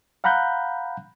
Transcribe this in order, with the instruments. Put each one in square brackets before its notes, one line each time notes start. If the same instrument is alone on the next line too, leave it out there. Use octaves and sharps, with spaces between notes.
[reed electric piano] F5 F#5 A#5 B5 F#6 G6